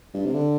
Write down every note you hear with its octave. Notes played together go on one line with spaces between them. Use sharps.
G2
C3
D3